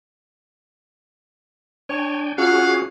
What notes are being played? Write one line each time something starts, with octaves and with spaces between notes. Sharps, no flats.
D4 C#5 G5 G#5
C#4 F4 F#4 G#4 F5 F#5